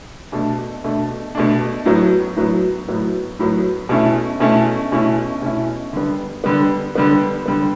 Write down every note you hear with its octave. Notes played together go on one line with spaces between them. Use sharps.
B2 A3 D4
B2 A3 D4
B2 A3 D4
A2 F#3 B3
A2 F#3 B3
A2 F#3 B3
A2 F#3 B3
B2 A3 C#4 E4
B2 A3 C#4 E4
B2 A3 C#4 E4
B2 A3 C#4 E4
D3 G3 B3
D3 G3 B3
D3 G3 B3
D3 G3 B3